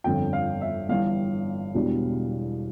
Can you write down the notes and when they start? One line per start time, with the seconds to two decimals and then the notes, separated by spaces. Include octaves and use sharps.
0.04 G1 F2 D3 F3 G5
0.33 F5
0.61 E5
0.89 G1 G2 E3 F5
1.74 E1 E2 B2 G3 D4